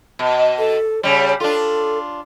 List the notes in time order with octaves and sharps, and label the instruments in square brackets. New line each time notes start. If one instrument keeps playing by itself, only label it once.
[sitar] B2
[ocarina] A4
[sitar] C#3 G3 [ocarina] C#5
[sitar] D4 F4 [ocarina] A4